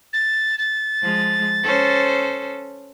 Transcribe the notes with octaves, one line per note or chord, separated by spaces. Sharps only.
A6
A6
F3 G#3
C#4 A4 C5